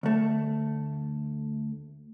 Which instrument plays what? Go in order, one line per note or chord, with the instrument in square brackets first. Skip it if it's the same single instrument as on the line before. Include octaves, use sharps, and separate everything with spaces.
[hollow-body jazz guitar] D2 A3